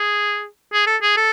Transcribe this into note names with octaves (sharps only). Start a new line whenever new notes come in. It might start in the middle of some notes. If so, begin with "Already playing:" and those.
Already playing: G#4
G#4
A4
G#4
A4